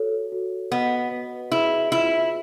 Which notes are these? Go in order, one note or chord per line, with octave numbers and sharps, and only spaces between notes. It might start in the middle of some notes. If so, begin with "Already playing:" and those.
Already playing: F#4 A4 C#5
F#4
B3 D#5
B4
E4 G#4
E4 F4